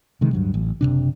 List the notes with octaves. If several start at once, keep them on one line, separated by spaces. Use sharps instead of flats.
C3 D#3 G#3
D1 G2 F#3
A1
F#1 C2 C3 D4